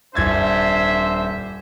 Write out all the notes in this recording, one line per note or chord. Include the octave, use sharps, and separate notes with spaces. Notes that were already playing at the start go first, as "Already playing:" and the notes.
D#1 D4 C5 E5 G#6 A6